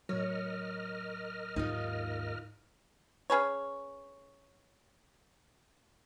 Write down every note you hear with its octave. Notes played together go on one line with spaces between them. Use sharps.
A2 F#3 A#4 C#5 D#5 F6
D#2 G#2 D#4 F4
C#4 G#4 B4 C#5